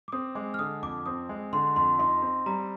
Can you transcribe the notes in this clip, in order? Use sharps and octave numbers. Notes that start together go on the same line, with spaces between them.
D6
C4 D#6
G#3 D6
F6
D3 D#6
F2 D6
C4 D#6
G#3
D3 C6
F2 C6
D#4 C6
C4
G3 A#5